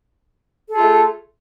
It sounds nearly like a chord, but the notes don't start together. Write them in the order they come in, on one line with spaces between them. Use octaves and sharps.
A4 G#4 F4 A3